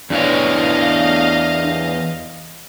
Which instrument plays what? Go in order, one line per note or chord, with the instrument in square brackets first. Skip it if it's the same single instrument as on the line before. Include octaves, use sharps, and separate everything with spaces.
[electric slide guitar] E2 E3 C#5 [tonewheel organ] D4 [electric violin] D#5 F5